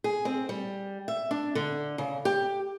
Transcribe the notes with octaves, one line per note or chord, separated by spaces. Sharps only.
G#4
C4
G3
E5
D4
D3
C#3
G4